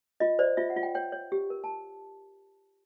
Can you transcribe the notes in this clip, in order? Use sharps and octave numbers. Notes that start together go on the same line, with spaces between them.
F4 D#5
C5 D5
F4 E5
F#5
F4
G5
C#5 G5
C#5
G4
A#4
A5